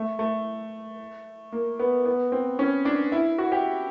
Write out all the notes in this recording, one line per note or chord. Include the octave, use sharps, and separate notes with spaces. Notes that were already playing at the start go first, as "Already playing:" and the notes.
Already playing: A3
A3
A#3
B3
B3
C4
C#4
D4
E4
F#4
G4